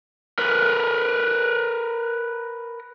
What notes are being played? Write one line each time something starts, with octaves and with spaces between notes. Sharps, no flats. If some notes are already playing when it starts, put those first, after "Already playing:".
A#4 B4